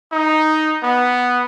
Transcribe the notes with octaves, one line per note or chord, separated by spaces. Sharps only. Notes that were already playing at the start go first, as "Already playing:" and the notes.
D#4
B3